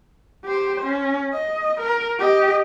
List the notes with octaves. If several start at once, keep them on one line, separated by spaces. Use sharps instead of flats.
G4 C5
C#4
D#5
A#4
G4 D#5